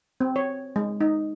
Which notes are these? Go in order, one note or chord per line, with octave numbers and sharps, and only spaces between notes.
C4
C#5
G#3
D#4